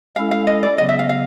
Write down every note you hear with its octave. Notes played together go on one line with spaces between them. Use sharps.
G#3 C#4 E4 A4 F5
F5
D#5
D5
C#3 F#3 B3 D#5
E5
F5
F5